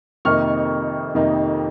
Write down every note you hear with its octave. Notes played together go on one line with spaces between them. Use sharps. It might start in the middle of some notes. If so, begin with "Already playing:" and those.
F2 C3 D#3 A#3 D#4 C#6 F6
F2 C3 D#3 A#3 D#4